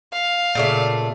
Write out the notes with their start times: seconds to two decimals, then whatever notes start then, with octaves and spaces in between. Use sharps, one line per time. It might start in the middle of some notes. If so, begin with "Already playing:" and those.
0.13 F5
0.55 A#2 C#3 A3